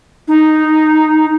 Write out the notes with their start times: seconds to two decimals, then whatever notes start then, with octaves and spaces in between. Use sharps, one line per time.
0.28 D#4